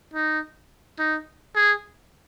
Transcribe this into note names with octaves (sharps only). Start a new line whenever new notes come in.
D#4
D#4
G#4